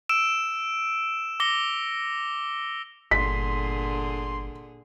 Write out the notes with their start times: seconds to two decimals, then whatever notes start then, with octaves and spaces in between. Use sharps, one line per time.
0.09 E6 D7 E7
1.40 D6 A#6 C#7 G7
3.11 G1 A#2 D3 G#4 C6 B6